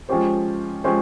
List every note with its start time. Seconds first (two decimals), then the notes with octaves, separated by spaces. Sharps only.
0.09 F3 G#3 C#4 G4 C5
0.84 F3 G#3 C#4 G4 C5